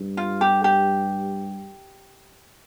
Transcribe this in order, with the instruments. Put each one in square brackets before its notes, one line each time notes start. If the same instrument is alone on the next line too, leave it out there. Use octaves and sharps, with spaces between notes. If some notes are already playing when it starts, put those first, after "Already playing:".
Already playing: [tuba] G2
[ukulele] F4
G4
G4